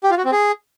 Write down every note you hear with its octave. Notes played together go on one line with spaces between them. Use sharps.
G4
F4
F#4
C4
G#4